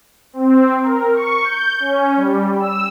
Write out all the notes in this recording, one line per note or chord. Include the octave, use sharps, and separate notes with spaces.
C4
A#4
C#6
G6
C#4
G3
E6